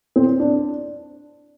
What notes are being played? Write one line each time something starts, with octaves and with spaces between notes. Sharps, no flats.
C4
D4